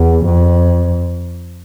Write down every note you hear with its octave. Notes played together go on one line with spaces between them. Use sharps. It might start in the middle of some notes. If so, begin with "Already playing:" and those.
Already playing: E2
F2